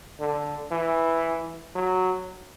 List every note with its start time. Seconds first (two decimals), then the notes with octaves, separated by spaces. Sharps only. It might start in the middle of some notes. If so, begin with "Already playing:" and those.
0.19 D3
0.71 E3
1.75 F#3